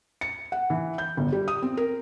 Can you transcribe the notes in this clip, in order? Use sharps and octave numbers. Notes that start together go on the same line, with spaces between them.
C#7
F#5
E3
G6
G1
G3
D#6
C4
A#4